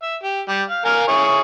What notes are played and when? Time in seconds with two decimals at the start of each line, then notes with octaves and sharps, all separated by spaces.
0.02 E5
0.24 G4
0.48 G3
0.70 F5
0.85 A#4 F5 G#5
1.08 E4 G#4 C#5